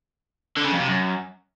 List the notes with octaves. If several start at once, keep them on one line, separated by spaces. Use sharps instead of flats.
D3
C#3
F2
C3
F#2